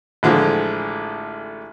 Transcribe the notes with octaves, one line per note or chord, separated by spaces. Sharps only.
A1 D3 F3 G#3